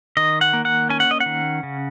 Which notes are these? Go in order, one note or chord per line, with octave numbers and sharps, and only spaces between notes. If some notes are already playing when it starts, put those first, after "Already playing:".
D#3 D#5
F#5
A#3
F#5
C#4 G#5
F#5
D#5
F#5
D#3
C#3